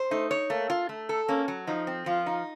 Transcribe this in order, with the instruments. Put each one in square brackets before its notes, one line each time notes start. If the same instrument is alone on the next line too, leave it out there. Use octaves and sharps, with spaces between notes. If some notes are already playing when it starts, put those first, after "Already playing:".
Already playing: [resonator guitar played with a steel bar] C5
[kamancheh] A3 [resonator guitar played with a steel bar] D#4
[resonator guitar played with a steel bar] C#5
[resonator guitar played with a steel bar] A3 [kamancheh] A#3
[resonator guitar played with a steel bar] F4
A3
A4
[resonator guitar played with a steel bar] A#3 [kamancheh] C#4
[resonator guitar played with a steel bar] F#3
[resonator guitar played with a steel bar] F3 [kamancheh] D#4
[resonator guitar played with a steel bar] C4
[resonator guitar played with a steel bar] F3 [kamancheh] F4
[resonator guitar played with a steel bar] D#4